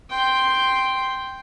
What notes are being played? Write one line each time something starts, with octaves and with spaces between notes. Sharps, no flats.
G5 C6